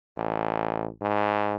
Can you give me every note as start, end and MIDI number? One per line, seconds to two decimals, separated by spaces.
0.17 0.89 33
1.02 1.56 44